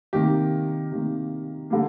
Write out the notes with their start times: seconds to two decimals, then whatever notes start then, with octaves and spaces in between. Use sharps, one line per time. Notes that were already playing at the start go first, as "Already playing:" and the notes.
0.13 C3 D#3 A#3 G4
0.92 C3 D#3 A#3
1.70 D3 G3 A#3